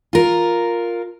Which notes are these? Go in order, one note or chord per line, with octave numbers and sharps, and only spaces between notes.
F4 A#4